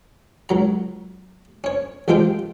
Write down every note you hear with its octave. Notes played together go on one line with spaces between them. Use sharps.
C#2 F#3 A#5
C#4 C#5
A1 F3 G#3 F4 G4 G5